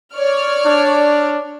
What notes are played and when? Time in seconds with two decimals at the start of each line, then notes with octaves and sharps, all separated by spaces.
0.14 C#5 D5 F6
0.66 D4